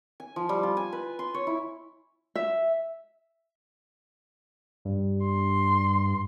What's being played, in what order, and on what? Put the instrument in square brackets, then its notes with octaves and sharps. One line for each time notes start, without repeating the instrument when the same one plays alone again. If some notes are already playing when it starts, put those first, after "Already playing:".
[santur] G#5
F3
G3
F4
G#5
B4
C6
C#5
E4
[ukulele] E5
[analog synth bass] G2
[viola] C6